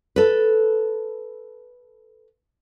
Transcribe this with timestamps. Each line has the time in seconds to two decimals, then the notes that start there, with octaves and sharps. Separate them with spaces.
0.16 A4 B4